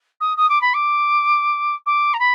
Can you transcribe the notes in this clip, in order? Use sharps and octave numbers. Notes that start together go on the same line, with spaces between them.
D#6
D#6
D6
B5
D6
D6
A#5
B5